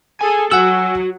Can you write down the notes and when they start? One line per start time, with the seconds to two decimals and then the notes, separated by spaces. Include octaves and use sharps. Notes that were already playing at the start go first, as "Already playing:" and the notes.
0.21 G#4 A4 G#5
0.51 F#3 F#4 F#5 G#5 E6